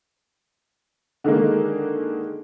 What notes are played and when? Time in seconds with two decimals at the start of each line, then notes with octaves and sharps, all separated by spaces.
1.24 D3 D#3 G#3 A#3